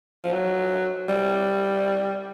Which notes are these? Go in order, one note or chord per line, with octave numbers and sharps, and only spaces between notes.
F3
F#3
G3